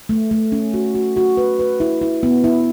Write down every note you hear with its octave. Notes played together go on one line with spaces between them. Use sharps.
A3
A3
C#4
F#4
F#4
F#4
B4
B4
E4
E4
B3
E4